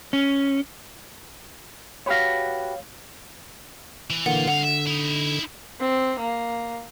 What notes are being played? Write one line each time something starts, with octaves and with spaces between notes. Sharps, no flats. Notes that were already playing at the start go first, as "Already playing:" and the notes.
C#4
F#4 G4 B4 C#5 F5
E3
A#2 D3 E3 A#3 F4 F#5
C2 D3 F5 F#5
E5
D#4 E4
C4
A#3